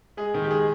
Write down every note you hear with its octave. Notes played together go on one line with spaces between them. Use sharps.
G#3 G#4
D#3
G4
G#3 G#4